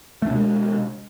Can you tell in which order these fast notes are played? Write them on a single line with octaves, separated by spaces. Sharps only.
A3 D4 B2 G#3